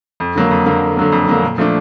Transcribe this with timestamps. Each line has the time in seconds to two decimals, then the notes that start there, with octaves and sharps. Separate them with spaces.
0.20 F2
0.35 D3 F#3 A#3
0.51 F2
0.66 D3 F#3 A#3
0.82 F2
0.97 D3 F#3 A#3
1.12 F2
1.28 D3 F#3 A#3
1.43 A#2
1.58 F3 A3 D4